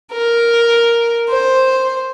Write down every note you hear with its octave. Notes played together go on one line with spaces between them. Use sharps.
A#4
C5